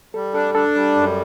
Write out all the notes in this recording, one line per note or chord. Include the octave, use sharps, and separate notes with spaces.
G3 A4
D4 A4
D4 A4
G3
F#2